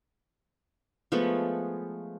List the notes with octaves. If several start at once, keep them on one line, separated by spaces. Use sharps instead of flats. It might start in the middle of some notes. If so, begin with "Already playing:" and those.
F3 G#3 A3 B3